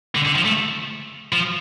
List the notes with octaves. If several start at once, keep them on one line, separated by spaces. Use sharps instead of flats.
D3
D3
F3
A3
F3